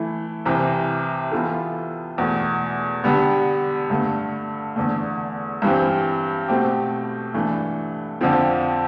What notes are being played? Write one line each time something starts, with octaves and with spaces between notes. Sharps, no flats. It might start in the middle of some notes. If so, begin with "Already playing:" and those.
Already playing: E3 A3 E4
C2 C3 E3 G3
E3 B3 F4 A4
E2 B2 A3
D3 G3 B3
G2 D3 A3
E2 D3 A3
G2 E3 G3 C4
B2 A3 C4 G4
G2 E3 A3 D4
F2 D3 F3 C4